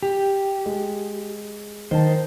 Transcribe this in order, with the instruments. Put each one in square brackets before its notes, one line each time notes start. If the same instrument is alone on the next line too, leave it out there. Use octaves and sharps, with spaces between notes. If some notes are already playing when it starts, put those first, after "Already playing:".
[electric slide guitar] G4
[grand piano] G#3
[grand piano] D#3 A5 [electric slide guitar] C5